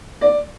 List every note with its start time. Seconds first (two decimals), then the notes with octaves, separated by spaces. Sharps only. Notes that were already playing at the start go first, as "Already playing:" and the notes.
0.21 D5